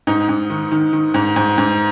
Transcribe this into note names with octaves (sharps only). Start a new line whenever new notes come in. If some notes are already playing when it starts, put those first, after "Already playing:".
G#2 D#4
G#2
D#3
D#3
D#3
G#2
G#2
G#2